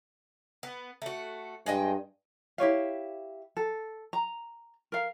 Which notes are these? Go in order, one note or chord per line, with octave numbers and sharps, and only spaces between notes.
B3
A3 F#4
G2 G#3 D#5 G5
E4 G4 C#5 F5
A4
A#5
A#4 F5